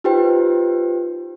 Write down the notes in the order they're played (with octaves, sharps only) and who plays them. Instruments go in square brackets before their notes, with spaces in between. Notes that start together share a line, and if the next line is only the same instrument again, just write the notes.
[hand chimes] D#4 F4 G4 B4 C5 G5